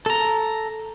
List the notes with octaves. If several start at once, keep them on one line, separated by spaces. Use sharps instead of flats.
A4 A#5